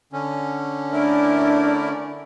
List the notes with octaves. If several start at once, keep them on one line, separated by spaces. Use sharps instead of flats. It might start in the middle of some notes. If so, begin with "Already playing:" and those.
D3 C#4
A3 D4 E4 A#4 D5